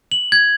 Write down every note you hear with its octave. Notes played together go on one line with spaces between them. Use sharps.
F#7
G#6